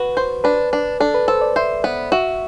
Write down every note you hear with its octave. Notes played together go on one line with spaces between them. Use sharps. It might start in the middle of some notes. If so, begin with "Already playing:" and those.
Already playing: F#4 B4
C5
D4 B4
D4
D4 A4
B4
A4 C5
D5
C5 E5
B3
F#4 E5